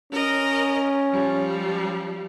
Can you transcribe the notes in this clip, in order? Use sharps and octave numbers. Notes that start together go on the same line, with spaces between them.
C#4 A#4 D#5
F3 G3